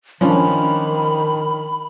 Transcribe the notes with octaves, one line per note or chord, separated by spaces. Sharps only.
D#3 F3 C#4 D4 B5